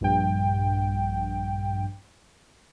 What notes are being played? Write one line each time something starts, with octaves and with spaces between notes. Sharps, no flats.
A#1 G2 G5